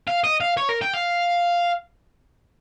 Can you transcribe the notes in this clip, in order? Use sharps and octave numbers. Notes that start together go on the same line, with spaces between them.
F5
D#5
F5
C#5
A#4
G5
F5